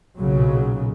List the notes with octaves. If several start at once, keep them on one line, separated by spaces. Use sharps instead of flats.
B1 A#2 C#3 F#3